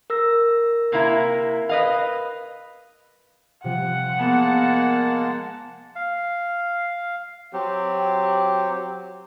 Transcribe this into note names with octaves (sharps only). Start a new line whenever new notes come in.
A#4 E6 A#6
C3 A#3 E4
B4 D#5 F5
C3 F3 F#5
G#3 A#3 B3 A5 B5
F5
F#3 C4 G4